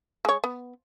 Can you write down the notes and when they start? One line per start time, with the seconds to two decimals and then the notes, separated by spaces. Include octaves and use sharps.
0.25 G#3 C#5
0.44 B3